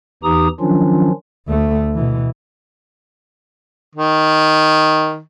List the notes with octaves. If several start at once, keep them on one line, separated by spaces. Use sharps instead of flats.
E2 E3 D#4 G4 A#5 D#6
D#3 F3 F#3 C#4 D4 F4
D2 A3
B2 E3
D#3